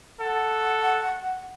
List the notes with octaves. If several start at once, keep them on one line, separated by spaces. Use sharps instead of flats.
A4 F#5